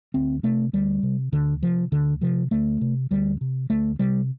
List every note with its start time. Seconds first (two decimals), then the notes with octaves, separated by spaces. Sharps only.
0.14 D2 C4
0.43 C3 A3
0.73 D2 G3
1.03 C3
1.32 D2 D3
1.62 C3 F3
1.92 D2 D3
2.21 C3 F3
2.51 D2 A3
2.81 C3
3.11 D2 G3
3.41 C3
3.70 D2 A3
3.99 C3 G3